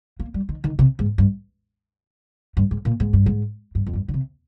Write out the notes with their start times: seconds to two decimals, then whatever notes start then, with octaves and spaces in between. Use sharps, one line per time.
0.20 A#3
0.34 G3
0.49 D#3
0.64 D#3
0.79 C3
0.99 G#2
1.18 G2
2.57 G2
2.71 G#2
2.85 A#2
3.00 G#2
3.13 G2
3.26 G#2
3.75 G2
3.86 F2
3.93 G2
4.08 D3
4.14 C3